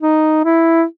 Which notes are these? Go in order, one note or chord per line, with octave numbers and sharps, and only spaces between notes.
D#4
E4